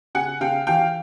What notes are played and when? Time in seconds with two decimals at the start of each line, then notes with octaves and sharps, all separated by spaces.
0.15 C#3 F#5 G#5
0.41 C#3 F5 G5
0.67 E3 F5 G5